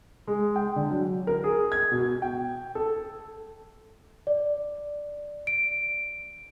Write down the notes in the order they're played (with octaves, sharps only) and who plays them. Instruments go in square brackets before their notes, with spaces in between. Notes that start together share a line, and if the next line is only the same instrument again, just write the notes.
[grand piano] G#3
G5
D3
F#3
A#4
G#4
G#6
B2
G5
A4
[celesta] D5
D7